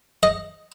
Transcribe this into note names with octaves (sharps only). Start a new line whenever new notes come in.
D#5